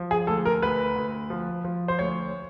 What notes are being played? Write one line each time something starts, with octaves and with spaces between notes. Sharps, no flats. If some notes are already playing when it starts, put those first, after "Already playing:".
Already playing: F3
G#4
D2 A4
A#4
D2 B4
D2
F3
F3
C5
D2 C#5